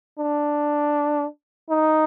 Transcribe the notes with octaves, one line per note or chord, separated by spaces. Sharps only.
D4
D#4